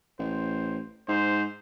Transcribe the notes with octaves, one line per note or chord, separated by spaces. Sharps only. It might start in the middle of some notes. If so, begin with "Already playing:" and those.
A1 C5
G#2 C5